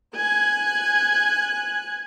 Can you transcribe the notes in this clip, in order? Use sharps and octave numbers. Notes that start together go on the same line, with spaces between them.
G#5 F#6 G#6